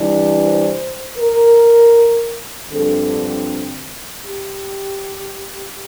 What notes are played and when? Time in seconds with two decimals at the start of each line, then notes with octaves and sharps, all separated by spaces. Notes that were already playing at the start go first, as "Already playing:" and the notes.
Already playing: C3 E3 G3 D4
0.41 C5
1.18 A#4
2.70 G2 D3 F3 C4 A4
4.23 G4